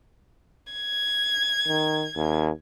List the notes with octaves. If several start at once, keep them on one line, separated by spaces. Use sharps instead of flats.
G#6
D#3
D#2